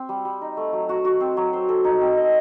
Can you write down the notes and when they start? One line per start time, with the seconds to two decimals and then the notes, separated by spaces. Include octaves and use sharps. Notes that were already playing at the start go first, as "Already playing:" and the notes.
Already playing: C4
0.09 G3
0.25 G3
0.41 D#4
0.57 A3
0.73 F#3
0.89 F#4
1.05 F#4
1.20 C4
1.37 F#3
1.53 C5
1.69 A4
1.84 D#4
2.01 C4
2.17 D#5